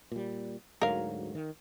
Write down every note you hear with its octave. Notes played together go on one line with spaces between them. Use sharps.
A#2 G3
D2 G#2 F#3 A#4 F5
D#3